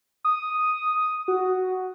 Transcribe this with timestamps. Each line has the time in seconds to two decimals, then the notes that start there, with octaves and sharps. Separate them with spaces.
0.25 D#6
1.28 F#4